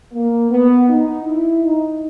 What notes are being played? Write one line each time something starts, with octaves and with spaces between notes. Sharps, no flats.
A#3
B3
D#4
E4
D#4